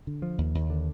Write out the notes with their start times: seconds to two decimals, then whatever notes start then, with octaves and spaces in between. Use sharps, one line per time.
0.07 D3
0.22 F3
0.38 D#2
0.55 D#2
0.70 D3